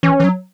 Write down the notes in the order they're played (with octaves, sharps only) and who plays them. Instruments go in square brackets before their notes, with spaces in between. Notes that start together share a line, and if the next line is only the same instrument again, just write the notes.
[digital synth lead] E3 [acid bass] C#4
[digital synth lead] E3
F#3